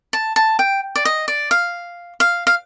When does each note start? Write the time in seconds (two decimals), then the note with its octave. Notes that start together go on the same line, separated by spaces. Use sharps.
0.13 A5
0.36 A5
0.59 G5
0.96 D5
1.05 D#5
1.28 D5
1.51 F5
2.20 F5
2.47 F5